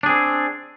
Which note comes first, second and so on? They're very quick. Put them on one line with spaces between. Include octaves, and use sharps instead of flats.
D4 G#4 C4